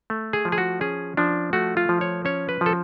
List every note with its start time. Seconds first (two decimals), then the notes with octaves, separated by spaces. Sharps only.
0.10 A3
0.33 G#4
0.45 F3
0.52 G#4
0.58 F#4
0.81 C#4 G#4
1.17 F3 D4
1.53 A3 F#4
1.77 F4
1.89 F3
2.01 C#5
2.25 C#4 C#5
2.49 B4
2.61 F3 A4